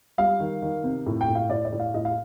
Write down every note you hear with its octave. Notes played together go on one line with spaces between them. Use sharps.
G3 F5
D#3
D#3
C3
A2
G5
A2
F5
A2 D5
D5
A2
F5
A2 D#5
F5